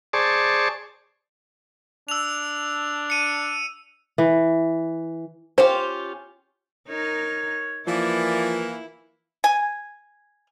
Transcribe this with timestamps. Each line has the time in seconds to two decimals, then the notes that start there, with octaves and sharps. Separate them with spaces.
0.13 G#4 C5 D5 A5 C#6
2.08 D4 E6 F7
3.10 C#7 D#7
4.18 E3
5.58 C#4 F4 G4 C5
6.89 D#4 A#4 C#5
7.87 E3 F3 A#3 E4 D5
9.44 G#5